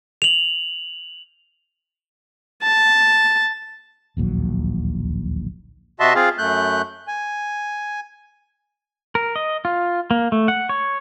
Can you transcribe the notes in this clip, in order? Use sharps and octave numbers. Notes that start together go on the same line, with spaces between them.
F7 F#7
A5
D1 A#1 D#2 F#3
C3 F#4 D#5 E5 A5 C6
C4 F4 G#4 F5
F#2 A3 F#6 G6
G#5
A#4
D#5
F4
A#3
A3
F#5
C#5